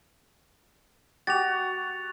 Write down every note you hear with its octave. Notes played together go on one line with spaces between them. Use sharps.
F#4 G4 A6 F7